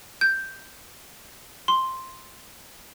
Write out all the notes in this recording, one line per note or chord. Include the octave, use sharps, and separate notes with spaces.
G6
C6